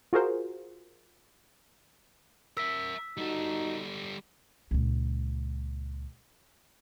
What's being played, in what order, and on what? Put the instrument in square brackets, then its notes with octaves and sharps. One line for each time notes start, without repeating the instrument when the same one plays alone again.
[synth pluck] F4 F#4 G#4 A#4 C5
[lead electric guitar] A#4 E5 [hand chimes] E6 B6
[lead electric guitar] G3 A4 [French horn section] D#4 F#4
[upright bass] C#2 A#2